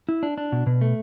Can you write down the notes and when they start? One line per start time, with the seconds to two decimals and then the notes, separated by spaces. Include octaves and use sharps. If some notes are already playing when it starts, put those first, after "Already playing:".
0.09 E4
0.23 D4
0.38 D4
0.52 B2
0.67 B2
0.81 A3